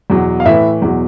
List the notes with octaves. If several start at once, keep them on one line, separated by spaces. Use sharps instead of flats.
E2 B2 F#3
F5
A2 E3 E4 E5
E2 B2 F#3